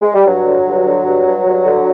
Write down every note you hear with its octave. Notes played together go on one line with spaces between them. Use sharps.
G#3
G3
G2 F#3
D3
G2
D3
G2
G2
G2
D3